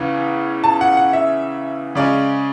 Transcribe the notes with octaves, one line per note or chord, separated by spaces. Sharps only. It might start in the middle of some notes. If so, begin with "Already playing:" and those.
Already playing: E2 C#3 E3 C#4
A5
F#5
F#5
E5
C#3 G#3 C#4 D5